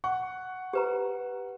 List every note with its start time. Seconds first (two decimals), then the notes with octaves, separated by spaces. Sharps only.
0.04 F#5 C#6
0.73 G4 B4 A#5